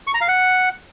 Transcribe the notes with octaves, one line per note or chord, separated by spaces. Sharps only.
C#6
A#5
F5
F#5